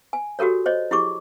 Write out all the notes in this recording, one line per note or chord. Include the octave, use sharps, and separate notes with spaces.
G#5
F#4 G4 A4 A#4 C#5
C5 C#5 D#5
E4 G4 G#4 C#6 D6